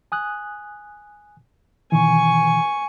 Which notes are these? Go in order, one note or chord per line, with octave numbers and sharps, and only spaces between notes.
G#5 D#6 F#6
B2 D#3 E3 G#5 C#6